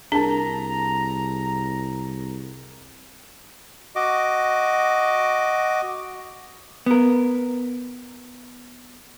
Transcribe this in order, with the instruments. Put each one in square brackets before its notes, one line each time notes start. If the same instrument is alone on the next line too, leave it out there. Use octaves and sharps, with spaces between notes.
[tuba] C2 [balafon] D4 [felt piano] G#4 A#4 A5 [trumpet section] A#5
[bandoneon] F#4 D#5 D6
[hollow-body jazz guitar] B3 A#4